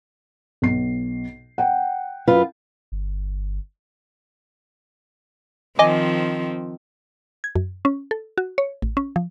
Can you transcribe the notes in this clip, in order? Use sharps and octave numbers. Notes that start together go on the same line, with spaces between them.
B1 C7
F#5 G5
F#2 F4 B4
G1
D#3 F3 C4 D#5 G#5 D6
G#6
F#2
C#4
A4
F#4
C#5
A1
C#4
F3